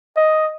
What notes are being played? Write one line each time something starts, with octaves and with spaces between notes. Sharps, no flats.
D#5